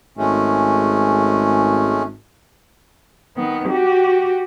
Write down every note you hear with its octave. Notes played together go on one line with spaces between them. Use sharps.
G#1 G#3 A3 C#4
D#3 B3
F#4 G4